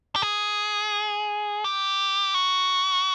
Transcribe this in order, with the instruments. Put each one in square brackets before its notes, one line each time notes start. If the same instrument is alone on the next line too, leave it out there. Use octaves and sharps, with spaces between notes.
[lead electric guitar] G4
G#4
G4
F#4